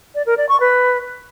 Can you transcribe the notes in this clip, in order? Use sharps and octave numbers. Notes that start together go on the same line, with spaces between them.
D5
A#4
D5
C#6
B4